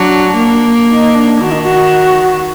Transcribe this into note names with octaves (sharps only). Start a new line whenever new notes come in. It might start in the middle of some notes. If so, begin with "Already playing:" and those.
Already playing: F#3 D4
A#3
D#4
D4
D#3 F#4
D#4
F#4